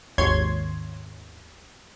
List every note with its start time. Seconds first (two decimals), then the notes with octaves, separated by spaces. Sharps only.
0.18 G#1 D#2 C#5 C6 G#6